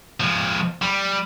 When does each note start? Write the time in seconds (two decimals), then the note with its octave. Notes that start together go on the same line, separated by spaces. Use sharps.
0.20 F3 G#3
0.82 G3